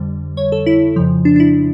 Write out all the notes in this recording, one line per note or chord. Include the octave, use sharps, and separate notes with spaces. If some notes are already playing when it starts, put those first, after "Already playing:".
Already playing: F2 D3 G3
C#5
A4
E4
F2 C#3 F3
D4
D4
E4